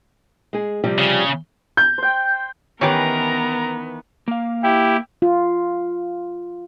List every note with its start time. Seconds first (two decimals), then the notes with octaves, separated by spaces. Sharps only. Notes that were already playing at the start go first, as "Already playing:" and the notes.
0.53 G#3 G#4
0.84 C3 F3 G3
0.98 C#3
1.77 G6
1.98 C5 G5
2.81 D#3 E3 B3 C#4 G4 A#4 B4 A#5
4.28 A#3 F5
4.63 E4 G4 G5
5.22 F4